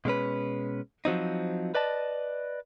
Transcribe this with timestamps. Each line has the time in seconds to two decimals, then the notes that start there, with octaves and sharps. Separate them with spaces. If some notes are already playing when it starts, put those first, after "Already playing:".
0.05 B2 G#3 C#4 B4
1.05 F3 F#3 C4 D#4
1.75 B4 D5 D#5 A5